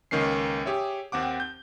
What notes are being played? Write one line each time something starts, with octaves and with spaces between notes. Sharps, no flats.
C#2 D#3 A#3 C#4 C7
G4 G#4 C#5 E5
D#2 C4 F#5 D6
G6